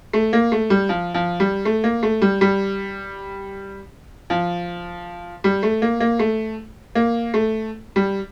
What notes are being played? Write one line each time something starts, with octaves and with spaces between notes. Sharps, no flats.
A3
A#3
A3
G3
F3
F3
G3
A3
A#3
A3
G3
G3
F3
G3
A3
A#3
A#3
A3
A#3
A3
G3